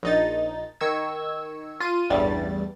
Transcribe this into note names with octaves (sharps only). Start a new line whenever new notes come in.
A#1 D#4 A6
D#3 C#6 E6 G#6
F4 D#7
A1 E2 G2 G3 A6